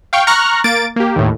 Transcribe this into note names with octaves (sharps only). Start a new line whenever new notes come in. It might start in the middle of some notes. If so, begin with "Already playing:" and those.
F5 G5 C#6
A#5 C#6 F6 F#6 A#6
A#3 A6 D7
A#3 G4
D#2 A2